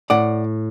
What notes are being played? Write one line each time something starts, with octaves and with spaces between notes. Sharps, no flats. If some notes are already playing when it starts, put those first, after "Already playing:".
A2 D5 F#5